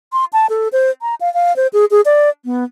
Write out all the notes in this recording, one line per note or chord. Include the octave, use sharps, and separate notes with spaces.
C6
A5
A4
C5
A#5
F5
F5
C5
G#4
G#4
D5
B3